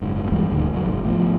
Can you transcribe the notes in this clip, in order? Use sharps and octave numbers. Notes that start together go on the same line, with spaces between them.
F#1 G#2
E2 G2 E3 G#3
D#1 D2 D3 D#3
F1 C#3 F#3
G#1
G#1 A2 F3 B3